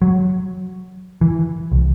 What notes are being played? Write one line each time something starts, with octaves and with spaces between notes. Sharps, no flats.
F#3
E3
C2